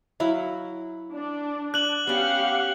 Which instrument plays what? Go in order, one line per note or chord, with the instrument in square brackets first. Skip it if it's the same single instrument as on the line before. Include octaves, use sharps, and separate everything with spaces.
[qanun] F#3 E4 F5
[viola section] D4
[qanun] D5 [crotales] F#6 F#7
[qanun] B3 C#4 [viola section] G4 F5 F#5